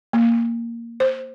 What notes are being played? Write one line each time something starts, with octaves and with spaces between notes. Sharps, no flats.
A#3
C5